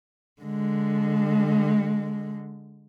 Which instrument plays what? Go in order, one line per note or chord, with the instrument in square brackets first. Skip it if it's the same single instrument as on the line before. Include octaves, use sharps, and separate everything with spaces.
[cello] D3 G#3